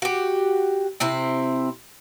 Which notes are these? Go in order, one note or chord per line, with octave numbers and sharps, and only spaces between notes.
F#4 G4
C3 C4 E4